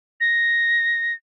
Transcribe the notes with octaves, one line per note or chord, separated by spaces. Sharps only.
A#6